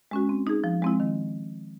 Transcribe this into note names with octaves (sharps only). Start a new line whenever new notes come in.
G#3 C#4 F#4
C4
D#4 G#4
F3
G#3 C4 E4
D#3